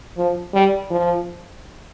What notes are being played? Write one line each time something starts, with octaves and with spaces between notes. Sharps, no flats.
F3
G3
F3